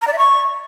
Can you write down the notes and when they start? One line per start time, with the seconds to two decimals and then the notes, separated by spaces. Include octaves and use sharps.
0.02 A#5
0.07 D5
0.13 E5
0.18 C#6